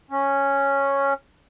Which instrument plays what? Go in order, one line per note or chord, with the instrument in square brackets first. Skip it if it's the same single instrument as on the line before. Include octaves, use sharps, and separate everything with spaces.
[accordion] C#4